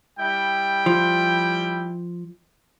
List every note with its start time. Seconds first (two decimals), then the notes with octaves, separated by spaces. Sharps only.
0.19 G3 E4 G5
0.86 F3